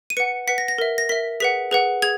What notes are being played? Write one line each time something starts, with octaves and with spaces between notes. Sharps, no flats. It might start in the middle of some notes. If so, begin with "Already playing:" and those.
D#7
B4 F#5 C#7
B4 F#5 B6
A#6
A#6
A#4 E5
A#6
A#4 E5 B6
G#4 B4 F#5 B6
G#4 B4 F#5
G#4 G#6